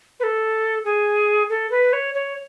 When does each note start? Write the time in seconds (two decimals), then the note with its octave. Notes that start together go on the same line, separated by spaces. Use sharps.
0.19 B4
0.23 A4
0.84 G#4
1.49 A4
1.70 B4
1.92 C#5
2.14 C#5